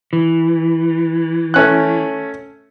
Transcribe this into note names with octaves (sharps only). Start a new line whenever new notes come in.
E3
A3 C#4 F#6